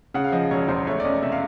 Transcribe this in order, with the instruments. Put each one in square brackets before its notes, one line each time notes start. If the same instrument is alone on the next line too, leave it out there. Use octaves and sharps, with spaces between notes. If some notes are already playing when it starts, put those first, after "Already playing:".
[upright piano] C#3 [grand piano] F#5
[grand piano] F5
[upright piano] F3 [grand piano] D#5
[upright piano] E1 [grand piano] C#5
[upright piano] E2 [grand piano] C5
[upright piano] A3 [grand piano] C#5
[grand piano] D5
[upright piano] C#4 [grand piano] D#5
[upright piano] C3 [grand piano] E5
[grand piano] F5